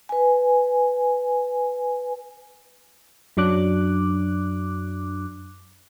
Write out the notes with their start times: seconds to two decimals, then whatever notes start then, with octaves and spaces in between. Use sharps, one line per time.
0.09 B4 G#5
3.37 F#2 F#3 D4 D6 F#6